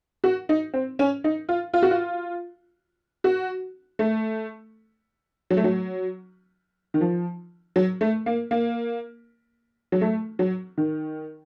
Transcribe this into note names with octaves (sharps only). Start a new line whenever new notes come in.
F#4
D#4
C4
C#4
D#4
F4
F4
F#4
F4
F#4
A3
F#3
A3
F#3
D#3
F3
F#3
A3
A#3
A#3
F#3
A3
F#3
D#3